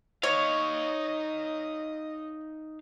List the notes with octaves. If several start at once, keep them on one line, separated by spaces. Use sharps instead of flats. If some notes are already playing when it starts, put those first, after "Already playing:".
D#4 C#5 D#5 F5